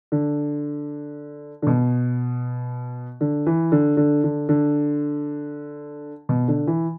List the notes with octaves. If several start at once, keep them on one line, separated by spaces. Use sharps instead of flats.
D3
D3
B2
D3
E3
D3
D3
D3
D3
B2
D3
E3